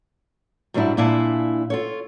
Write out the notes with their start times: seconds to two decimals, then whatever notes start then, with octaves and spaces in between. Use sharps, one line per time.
0.74 G#2 F#3 G3 D4 E4
0.97 A#2 D4 E4 F5 G#5 A5
1.70 F4 A4 C#5